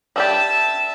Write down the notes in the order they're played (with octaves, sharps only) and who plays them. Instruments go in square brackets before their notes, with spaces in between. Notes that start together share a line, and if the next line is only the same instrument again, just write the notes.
[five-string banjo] G3 D4 G4 [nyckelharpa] E5 A5